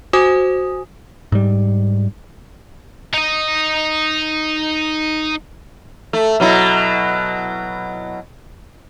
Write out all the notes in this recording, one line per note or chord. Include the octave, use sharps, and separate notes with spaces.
F#4 C5 G#5 D#6
G#2 G3
D#4 D#5
A3
B2 F#3 E4